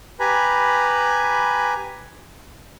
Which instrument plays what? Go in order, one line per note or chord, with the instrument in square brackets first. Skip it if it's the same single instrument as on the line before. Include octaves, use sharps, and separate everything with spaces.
[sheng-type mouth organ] G4 B4 G#5 A#5 B5